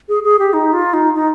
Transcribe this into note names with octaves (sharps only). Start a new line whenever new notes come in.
G#4
G#4
G4
D#4
F4
D#4
D#4